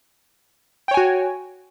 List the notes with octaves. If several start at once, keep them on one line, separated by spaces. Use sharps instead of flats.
F#4 C#5 G5 G#5